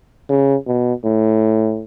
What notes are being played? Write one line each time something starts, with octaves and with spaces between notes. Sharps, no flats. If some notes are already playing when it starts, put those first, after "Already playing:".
C#3
B2
A2